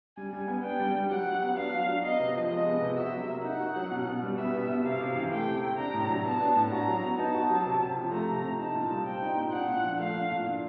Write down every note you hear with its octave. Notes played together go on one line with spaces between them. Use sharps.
G3 G#5
G3
B3
D4 G5
G3
G3
F#3 F#5
F#3
B3
D4 F5
F#3
F#3
B3 D#5
C3
F3
G#3 D#5
B3
C3
F#4 E5
F#3
A#3
D#4 F#5
F#4
F#3
B2
B2
G3
B3 E5
B2
B2
C3 F5
C3
E3
A3 G5
C3
C3
D4 A#5
A2
F#3
B3 A5
D4
A2
F#4 A#5
F#3
B3
D#4 A5
F#4
F#3
C3
C3
F3
A3 A#5
C3
C3
D#4 A5
A#2
G3
C4 G5
D#4
A#2
D4 F#5
A#2
F3
A3 F5
D4
A#2
A#2